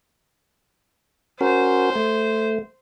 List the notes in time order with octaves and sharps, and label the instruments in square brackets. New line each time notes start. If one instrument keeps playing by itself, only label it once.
[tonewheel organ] C#4 F#4 A#4 [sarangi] C5
[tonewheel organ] A3